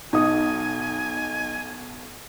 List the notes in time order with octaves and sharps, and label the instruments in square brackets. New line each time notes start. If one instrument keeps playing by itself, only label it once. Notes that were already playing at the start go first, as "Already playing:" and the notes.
[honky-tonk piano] B1 [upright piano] D#4 D#6 [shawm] G#5